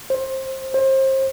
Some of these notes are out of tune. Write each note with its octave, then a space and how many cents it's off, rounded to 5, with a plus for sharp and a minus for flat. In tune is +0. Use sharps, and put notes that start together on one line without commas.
C5 +20
C5 +30